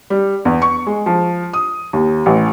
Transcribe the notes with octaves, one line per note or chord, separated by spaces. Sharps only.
G3
E2
C#6
G#3
F3
D#6
D#2
A1